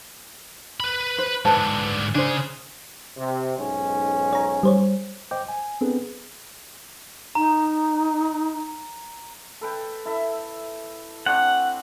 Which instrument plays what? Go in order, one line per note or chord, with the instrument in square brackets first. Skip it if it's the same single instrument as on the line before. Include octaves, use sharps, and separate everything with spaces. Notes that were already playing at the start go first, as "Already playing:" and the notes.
[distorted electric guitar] B4 B5
[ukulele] C5
[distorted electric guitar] G#2 D3 [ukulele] B4 C5 A5
[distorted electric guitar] C#3 G#4 [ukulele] D4 C5
[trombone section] C3
B1 G#2 C#4
[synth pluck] C#5 A#5
G3 C5 C#5
[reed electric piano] C5 D#5 G5 D6 G6
G#5
B3 C4 D4 G#4 A4 B4
[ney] D#4 [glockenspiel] A#5
[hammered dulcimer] A4 B4 G5
E4 A4 E5
[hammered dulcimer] C4 D4 C#6 [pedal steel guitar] F#5